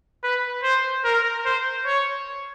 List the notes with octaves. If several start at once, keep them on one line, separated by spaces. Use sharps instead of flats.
B4
C5
A#4
C5
C#5